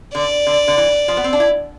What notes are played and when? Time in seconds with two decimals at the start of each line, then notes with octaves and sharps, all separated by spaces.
0.15 D3 D5
0.47 D3
0.68 D3
0.78 E3
1.08 F3
1.17 B3
1.24 C4
1.33 D4
1.40 E4